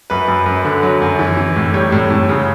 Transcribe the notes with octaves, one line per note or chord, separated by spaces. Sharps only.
F#2 B4
F#2
F#2
D3
F#3
F#2
E3
E3
A2
G3 C#5
A2
A2
C#3